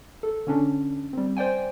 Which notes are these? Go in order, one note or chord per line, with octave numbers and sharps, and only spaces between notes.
A4
D3 C#4 D4
G3 C4
C5 D5 G5 G#5